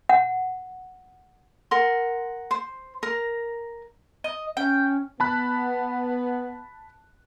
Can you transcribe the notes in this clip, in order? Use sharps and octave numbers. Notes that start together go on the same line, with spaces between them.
F#5
A#4 F#5 C6
C5
A#4 A#5
D#5
C#4 G5
B3 A5 B5 F#6